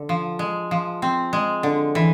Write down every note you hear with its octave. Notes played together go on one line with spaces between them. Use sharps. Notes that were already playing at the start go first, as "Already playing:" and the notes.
Already playing: D3
F3
G#3
F3
C4
G#3
D3
E3